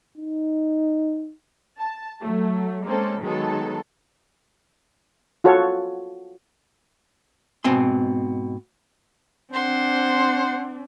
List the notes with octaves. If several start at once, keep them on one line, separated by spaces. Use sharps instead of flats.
D#4
A5
F#3 A3
G#3 A#3 C4 C#4 A4
D#3 F#3 G#3 B3 A4
F4 F#4 A4 C#5
G#2 B2 C4 G#5 C6
C4 D4 C5 F#5 C6